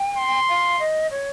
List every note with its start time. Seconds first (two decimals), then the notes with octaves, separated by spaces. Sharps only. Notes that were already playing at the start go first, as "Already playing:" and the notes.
Already playing: G5
0.18 C6
0.48 F5
0.79 D#5
1.10 C#5